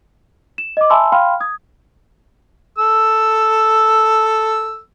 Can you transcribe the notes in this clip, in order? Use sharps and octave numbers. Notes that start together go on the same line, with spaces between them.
E7
D#5 D6
E5 G#5 A5 B5 C6 E6
F5 G5 B5 C6 F6
D#6 G#6
A4 E6